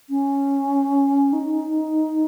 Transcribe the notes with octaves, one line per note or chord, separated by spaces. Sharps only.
C#4
D#4